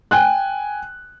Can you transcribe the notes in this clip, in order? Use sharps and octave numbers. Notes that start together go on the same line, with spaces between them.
G5 G#5 F#6